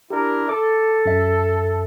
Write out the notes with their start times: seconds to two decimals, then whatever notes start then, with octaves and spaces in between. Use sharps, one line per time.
0.10 D4 E4 G4 A#4
0.49 A4 D6
1.06 F#2 E5